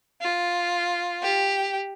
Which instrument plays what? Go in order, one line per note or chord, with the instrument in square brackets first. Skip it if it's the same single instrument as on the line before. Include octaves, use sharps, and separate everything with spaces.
[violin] F4
G4